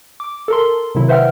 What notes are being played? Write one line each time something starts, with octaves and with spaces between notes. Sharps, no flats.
D6
A4 A#4 C6
C3 D#3 F#3 E4
B4 C5 E5 F#5 G5 F6